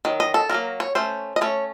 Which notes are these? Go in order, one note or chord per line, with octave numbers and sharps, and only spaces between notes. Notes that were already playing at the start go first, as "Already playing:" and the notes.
D#3 F#3
D#5
A4
D#3 F#3 A#3 A#4
C#5
A3 C#4 C5
D#5
A3 C#4 C#5